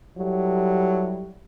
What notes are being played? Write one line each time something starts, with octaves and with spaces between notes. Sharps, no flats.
F#3 G3 E4 G4 A4